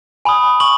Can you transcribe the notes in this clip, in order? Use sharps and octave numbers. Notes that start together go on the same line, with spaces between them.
G#5 B5 D#6
C#6 F#7